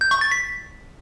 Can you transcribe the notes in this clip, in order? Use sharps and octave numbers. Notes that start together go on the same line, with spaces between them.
G6
C#6
A6
B6